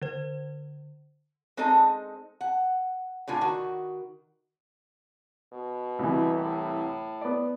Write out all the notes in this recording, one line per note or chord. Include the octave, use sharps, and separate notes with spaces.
D3 C5
G#3 C4 D#4 A4 D#5
F#5
A2 D3 F4 G#5
D#3 F#4
B2
C2 E3
A2
B3 D5